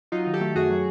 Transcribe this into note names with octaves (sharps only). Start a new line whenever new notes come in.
F#3 D#4 F4
D#3
G4 A4
A3
F#2 F#4 G#4
F#3